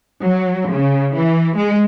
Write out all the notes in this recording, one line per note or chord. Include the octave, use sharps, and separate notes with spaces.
F#3
C#3
E3
G#3